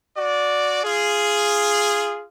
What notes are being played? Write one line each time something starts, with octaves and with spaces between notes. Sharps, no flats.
F#4 D5
F4 G#4